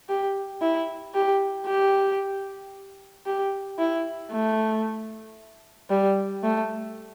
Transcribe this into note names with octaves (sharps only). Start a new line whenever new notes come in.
G4
E4
G4
G4
G4
E4
A3
G3
A3